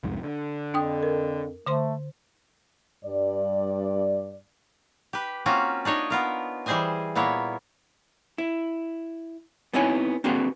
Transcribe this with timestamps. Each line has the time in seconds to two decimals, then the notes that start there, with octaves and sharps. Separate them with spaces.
0.03 C2 F2 G#2
0.24 D3
0.74 F2 D4 G5 D#6
1.03 A#4
1.66 D3 A3 C5 C6
3.04 G2 D5
5.13 G4 B4
5.46 A#3 C4 C#4 F4 F#4
5.85 D4 D#4 C#5 D#5
6.10 B3 F4 A#4
6.66 E3 G3 G#4 C5 D#5 G#5
7.15 A#2 A#3 B3 E4 C#5
8.38 E4
9.73 B3 C4 D#4 E4 C#5 G#5
10.24 A#3 C4 D4 F#4 G#4 B4